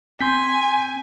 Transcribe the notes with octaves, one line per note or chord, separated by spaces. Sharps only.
C4 G#5 C6 G6 B6